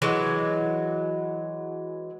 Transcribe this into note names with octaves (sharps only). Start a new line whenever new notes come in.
E3 F#3 G#3